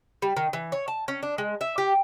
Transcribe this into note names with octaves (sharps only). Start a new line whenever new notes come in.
G3
D#3
E3
C#5
A5
C#4
D4
G#3
E5
G4